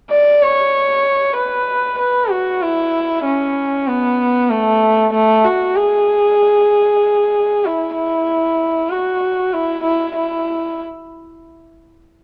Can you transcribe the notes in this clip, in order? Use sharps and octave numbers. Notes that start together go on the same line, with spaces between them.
D5
C#5
B4
B4
F#4
E4
C#4
B3
A3
A3
F#4
G#4
E4
E4
F#4
E4
E4
E4